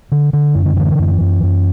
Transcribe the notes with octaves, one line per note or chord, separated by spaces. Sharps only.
D3
D3
F#2
D3
D3 E3
F#2
F#2
F#2